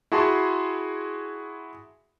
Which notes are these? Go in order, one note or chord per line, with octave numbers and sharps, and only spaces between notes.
E4 F#4 G#4 A5 C6